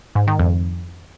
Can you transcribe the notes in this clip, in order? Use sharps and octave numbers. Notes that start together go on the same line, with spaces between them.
G#2
D#3
F2